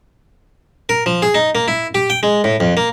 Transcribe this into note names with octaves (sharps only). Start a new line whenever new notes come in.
A#4
F3
G#4
D#4
A#3
E4
G4
G5
G#3
A2
F2
A#3